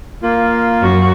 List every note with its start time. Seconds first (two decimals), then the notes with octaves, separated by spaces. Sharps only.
0.23 A#3 F4
0.82 F#2 F#4